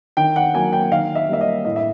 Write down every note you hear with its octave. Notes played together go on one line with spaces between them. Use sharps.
D#3 G5
F#5
F#3 A#3 G#5
G5
D#3 F5
E5
G3 A#3 E5
D#5
A2 D#5
E5